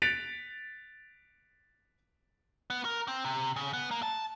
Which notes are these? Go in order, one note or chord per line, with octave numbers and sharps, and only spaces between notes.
F#6 A6 B6 C#7 D7 F7
B3
A#4
C4
C3
C#3
B3
A#3
A5